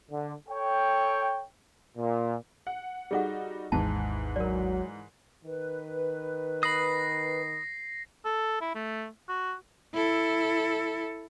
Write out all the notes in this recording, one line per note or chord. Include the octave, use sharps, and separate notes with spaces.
D3
A4 C#5 G5
A#2
F#5
G3 D#4 F#4 G#4 A4 F#5
G#1 D#2 G#2 E3 G#3 A5
F#3 A#4 D5
D#3 B4
B5 D#6 A#6 C7
A4
E4
A3
F#4
E4 A4